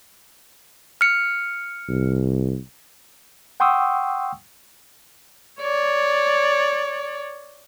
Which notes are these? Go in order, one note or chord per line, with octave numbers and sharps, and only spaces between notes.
F6 C#7
C2
F#5 G5 C6 C#6 D#6 E6
C#5 D5